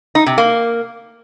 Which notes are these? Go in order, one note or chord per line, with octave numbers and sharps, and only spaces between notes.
D#4
C3
A#3